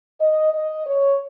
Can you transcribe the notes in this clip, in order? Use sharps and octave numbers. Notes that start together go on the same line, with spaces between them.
D#5
D#5
C#5